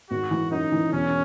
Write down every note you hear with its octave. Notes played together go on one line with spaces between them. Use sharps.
G#1 F#4
E3
F#2 D#4
E3
E1 C#4